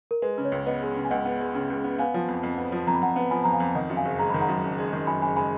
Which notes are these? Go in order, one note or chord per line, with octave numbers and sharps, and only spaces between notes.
A#4
G#3 B4
C#3
C#5
C#2
B3 B4 D#5
G#3
C#3
G#5
C#2 D#5 F#5
B3
G#3
C#3
C#2
B3
B3 F5 G#5
F3
F2
F2
B3
F3
F2 A#5
B5
F2 F#5 A#5
B3
F3 G#5 B5
F2 A#5
F5 G#5
F2
D#3 D#5 F#5
F#2
F5 G#5
F#1
G#3 A#5
D#3 B5
F#5 A#5
F#2
F#1
G#3
D#3
F#2 G#5 B5
F#1 G#5 B5
G#3 G#5 B5